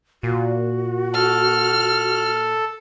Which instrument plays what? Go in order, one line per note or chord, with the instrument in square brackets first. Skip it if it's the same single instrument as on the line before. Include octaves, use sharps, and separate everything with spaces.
[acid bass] A#2 [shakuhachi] F#4
[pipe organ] A4 [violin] F6